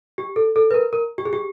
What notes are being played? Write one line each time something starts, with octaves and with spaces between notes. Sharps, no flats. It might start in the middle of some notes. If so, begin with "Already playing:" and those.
G4
A4
A4
B4
A#4
A#4
G4
G#4
G4